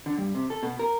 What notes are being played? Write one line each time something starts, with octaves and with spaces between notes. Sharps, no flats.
D3
G2
C3
A4
B2
A#4